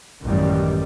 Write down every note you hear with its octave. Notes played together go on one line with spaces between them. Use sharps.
A1 F#2 D#3 G3